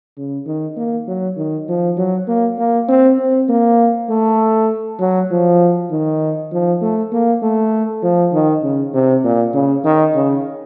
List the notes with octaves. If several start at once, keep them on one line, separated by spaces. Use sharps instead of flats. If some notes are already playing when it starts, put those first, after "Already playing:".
C#3
D#3
A#3
F#3
D#3
F3
F#3
A#3
A#3
C4
C4
A#3
A3
F#3
F3
D#3
F3
A3
A#3
A3
F3
D#3
C#3
C3
A#2
C#3
D#3
C#3